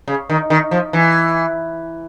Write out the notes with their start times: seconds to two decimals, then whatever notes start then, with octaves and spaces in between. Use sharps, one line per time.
0.08 C#3
0.30 D#3
0.50 D#3
0.71 F3
0.93 E3